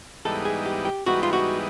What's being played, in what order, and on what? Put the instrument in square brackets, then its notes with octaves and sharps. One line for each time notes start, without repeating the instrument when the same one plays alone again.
[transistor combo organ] G#2 E3 G3 B3 D#4 [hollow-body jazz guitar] A4
[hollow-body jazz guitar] G#4
G4
G4
[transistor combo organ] G#2 E3 G3 B3 D#4 [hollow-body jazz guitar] F#4
[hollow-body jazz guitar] F4
F#4